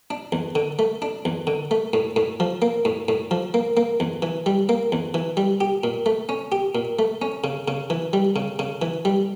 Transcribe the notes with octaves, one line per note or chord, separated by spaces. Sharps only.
D4
E2
D3
A3
D4
E2
D3
A3
A2
A2
F3
A#3
A2
A2
F3
A#3
A#3
E2
E3
G3
A#3
E2
E3
G3
G4
A#2
A3
C#4
G4
A#2
A3
C#4
C#3
C#3
E3
G3
C#3
C#3
E3
G3